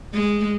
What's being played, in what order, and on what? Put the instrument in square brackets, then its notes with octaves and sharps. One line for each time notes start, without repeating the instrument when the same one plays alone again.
[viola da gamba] G#3